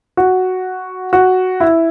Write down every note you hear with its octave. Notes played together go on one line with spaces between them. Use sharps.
F#4
F#4
E4